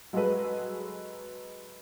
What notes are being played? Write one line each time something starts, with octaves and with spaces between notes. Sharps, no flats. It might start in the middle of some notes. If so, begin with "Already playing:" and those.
F#3 G#3 F#4 G#4 A4 B4